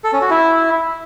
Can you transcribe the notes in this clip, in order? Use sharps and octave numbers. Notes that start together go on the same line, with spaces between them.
A4
C#4
F#4
E4